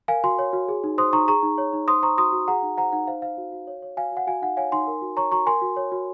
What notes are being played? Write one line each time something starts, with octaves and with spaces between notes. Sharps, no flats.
A#4 F5 G#5
F#4 G#5 C6
C#5
F#4
G#4
D#4
C5 C6 D#6
D#4 A#5 C#6
G#4 A#5 C#6
D#4
C#5
D#4
C5 C6 D#6
C5 A#5 C#6
F#4 C6 D#6
F#4
G#4 F#5 A#5
D#4
C5 F#5 A#5
D#4 F#5
C5 F5
C5 F5
F#4
F#4
C#5
C#5
F#4 F5 G#5
F#4 F#5
F#4 F5 G#5
D#4 F#5
C#5 F5 G#5
D#4 G#5 C6
A#4
F#4
C#5 A#5 C#6
F#4 A#5 C#6
A#4 G#5 C6
F#4
C#5
F#4